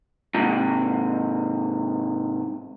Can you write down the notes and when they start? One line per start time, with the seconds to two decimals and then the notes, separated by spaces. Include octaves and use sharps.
0.34 G#2 C3